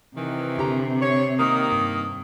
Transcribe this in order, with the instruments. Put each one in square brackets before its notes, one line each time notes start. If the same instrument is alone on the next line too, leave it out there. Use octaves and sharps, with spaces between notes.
[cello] C3 [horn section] D#3 E3
[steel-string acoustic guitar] D3 G4 A#5
[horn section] C#5
[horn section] D#3 A#3 [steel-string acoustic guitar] G4 A#5 [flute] D#6
[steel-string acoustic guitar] G2